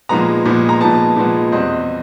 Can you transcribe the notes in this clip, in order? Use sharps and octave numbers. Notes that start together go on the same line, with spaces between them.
A#2 F3 G#3 B3 A#5
A#2 F3 G#3 B3
A#5
A#2 F3 G#3 B3 A5
A#2 F3 G#3 B3
E2 B2 G3 C4 D#5